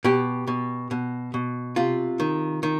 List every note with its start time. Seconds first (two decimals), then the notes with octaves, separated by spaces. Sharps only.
0.04 B2 G4
0.47 B2
0.91 B2
1.34 B2
1.76 C3 F4
2.20 D#3
2.63 D#3